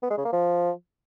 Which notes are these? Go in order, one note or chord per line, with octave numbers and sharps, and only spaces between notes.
B3
G#3
C#3
A#3
F3